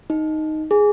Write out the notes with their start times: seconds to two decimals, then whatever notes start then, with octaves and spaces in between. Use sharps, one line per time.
0.10 D#4
0.71 G#4